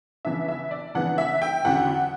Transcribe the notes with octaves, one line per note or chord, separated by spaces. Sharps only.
C#3 E3 B3 D4 E5
E5
D5
C#3 E3 B3 D4 F#5
E5
G5
E2 D3 F#3 C#4 E4 F#5